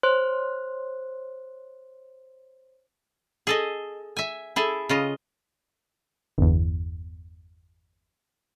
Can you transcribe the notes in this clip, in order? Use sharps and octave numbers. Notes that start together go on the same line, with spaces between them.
C5 C#5 C6 F#6
G#4 A4 D#5
E5 G#5
E4 G#4 A4
C#3 F4 D#5
G1 E2